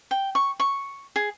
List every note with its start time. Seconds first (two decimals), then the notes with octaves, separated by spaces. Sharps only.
0.11 G5
0.35 C#6
0.60 C#6
1.16 G#4